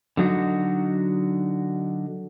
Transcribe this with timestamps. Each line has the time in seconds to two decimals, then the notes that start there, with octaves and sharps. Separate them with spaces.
0.17 D3 F#3 D#4 F#4